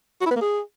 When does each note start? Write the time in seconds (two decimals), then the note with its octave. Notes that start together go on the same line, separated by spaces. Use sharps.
0.21 F#4
0.26 E4
0.31 B3
0.36 A#3
0.41 G#4